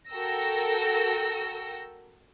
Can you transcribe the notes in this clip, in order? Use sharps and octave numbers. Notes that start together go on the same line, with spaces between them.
F#4 A4 A#4 G5 E6 A#6